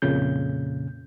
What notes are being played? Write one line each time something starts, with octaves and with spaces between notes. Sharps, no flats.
F2 A#2 C#3 G6